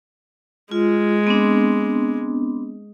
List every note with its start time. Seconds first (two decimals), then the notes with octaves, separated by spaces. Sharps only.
0.71 G#3 F4
1.27 B3 C4 D4